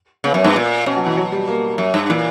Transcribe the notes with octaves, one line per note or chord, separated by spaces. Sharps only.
C#3 B3
F#2 C#4
G2 B3
A#2
B2 C#4
F#3
E3
F#3
G3
A#3
F#2
G2
A#2 E3